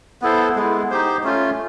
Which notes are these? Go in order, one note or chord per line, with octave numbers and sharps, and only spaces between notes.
B3 E4 A4 C5
G#3 B3 E4
D#4 G4 C5
A3 C#4 F4